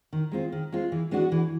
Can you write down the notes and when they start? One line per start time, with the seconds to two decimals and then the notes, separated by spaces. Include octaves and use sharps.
0.13 D#3
0.32 G#3 C4 F4
0.52 D#3
0.72 G#3 C4 F4
0.92 E3
1.11 G#3 B3 D4 F#4
1.32 E3